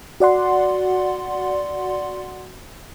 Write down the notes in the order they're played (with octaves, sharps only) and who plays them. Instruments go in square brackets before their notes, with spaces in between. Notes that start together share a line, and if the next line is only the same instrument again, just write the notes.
[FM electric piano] F#4 D5 F#5 C6